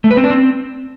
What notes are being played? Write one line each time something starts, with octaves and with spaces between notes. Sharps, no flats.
A3
B4
C4
D4
C4